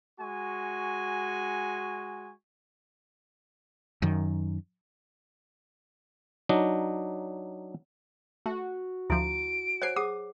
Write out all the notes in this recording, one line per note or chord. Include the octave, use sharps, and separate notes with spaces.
G#3 F#4 G#5 C#6
F#2 D#3
F#3 D4 D#4
A3 F#4
D2 F3 E4 D7
C5 C#5 F#5 G#5 C7
G#4 F#5 D6 D#6